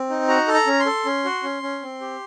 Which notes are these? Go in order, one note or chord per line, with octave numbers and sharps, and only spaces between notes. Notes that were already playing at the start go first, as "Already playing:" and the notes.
Already playing: C4
D#4
F#4 A#5
A4
A#5
C#4
C6
A4
C#4
F#4
C#4
C#4
C4
G4